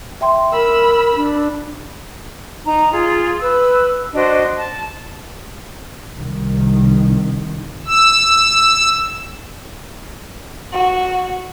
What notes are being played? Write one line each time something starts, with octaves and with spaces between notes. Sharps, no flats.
E5 G5 C6
A#4 B5 E6
D4
D#4 A#5
F4 G#4
B4 E6
D4 F#4 C5 D#5
A5
C2 D#3
E6
F#4